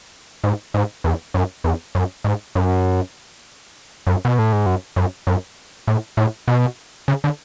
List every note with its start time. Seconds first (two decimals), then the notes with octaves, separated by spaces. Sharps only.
0.44 G#2
0.74 G#2
1.04 E2
1.34 F#2
1.64 E2
1.95 F#2
2.24 G#2
2.55 F#2
4.07 F#2
4.25 B2
4.39 A2
4.53 G#2
4.66 F#2
4.96 F#2
5.27 F#2
5.87 A2
6.17 A2
6.48 B2
7.08 C#3
7.24 D3